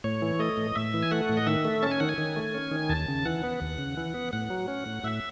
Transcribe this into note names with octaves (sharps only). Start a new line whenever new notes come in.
A2 C#5
E3
A3 D#5
A2
A2 E5
E3
G#5
A3 F#5
A2
D#5
D#3 E5
A3
C#4 A5
G#5
D#3 F#5
G#5
D#3
A3
C#4
D#3
D#2 A5
C#3
E3 F#5
B3
D#2
C#3
E3
B3
A2 F#5
F#3
C#4
A2
A2 E5